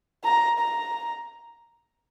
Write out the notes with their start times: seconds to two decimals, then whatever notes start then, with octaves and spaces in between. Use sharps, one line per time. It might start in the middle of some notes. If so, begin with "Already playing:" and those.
0.24 A#5
0.60 A#5